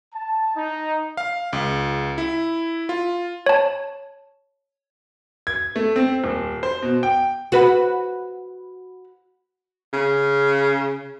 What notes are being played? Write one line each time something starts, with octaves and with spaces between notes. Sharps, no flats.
A5
D#4
F5
C#2
E4
F4
C#5 A5
G#6
A3
C4
D#1
C5
B2
G5
F#4 B4
C#3